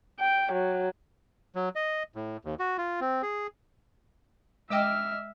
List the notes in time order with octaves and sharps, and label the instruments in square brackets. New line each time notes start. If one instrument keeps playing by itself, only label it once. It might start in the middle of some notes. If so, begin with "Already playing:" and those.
[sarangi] G5
F#3
[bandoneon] F#3
D#5
A2
D#2
F#4
F4
C4
G#4
[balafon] G#3 G5 [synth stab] D#5 D6 E6 [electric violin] E5 F6